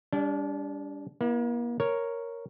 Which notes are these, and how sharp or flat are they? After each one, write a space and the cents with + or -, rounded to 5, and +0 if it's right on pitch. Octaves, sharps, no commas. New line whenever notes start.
G3 +20 D4 -35
A#3 +40 E4 +0
A#4 +0 C#5 +0